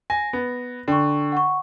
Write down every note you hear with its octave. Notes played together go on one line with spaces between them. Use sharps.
G#5 A#6
B3
D3 G5 C#6
F#5 C#6